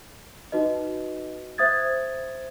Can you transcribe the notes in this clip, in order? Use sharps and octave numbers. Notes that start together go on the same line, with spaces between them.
D#4 F#4 B4 D#5
C5 E5 D#6 G#6 A6